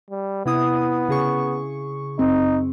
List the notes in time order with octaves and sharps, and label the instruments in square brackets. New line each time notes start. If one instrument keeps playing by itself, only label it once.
[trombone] G3
[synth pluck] C3 E4 D#6 [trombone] B3
[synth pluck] C#3 G#4 C#6
[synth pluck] F#2 C4 [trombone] D#4